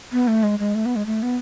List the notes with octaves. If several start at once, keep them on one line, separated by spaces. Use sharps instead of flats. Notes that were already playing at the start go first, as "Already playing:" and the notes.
B3
A3
G#3
G#3
A3
B3
G#3
A3
B3